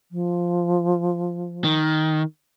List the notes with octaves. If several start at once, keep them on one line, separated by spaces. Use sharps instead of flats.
F3
D#3